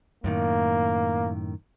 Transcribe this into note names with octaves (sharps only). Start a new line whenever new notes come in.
F#2 A2 D#3 A#3